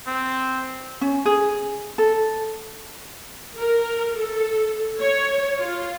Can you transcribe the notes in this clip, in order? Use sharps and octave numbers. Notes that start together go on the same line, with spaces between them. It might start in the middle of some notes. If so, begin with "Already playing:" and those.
C4
C#4
G#4
A4
A#4
A4
C#5
F4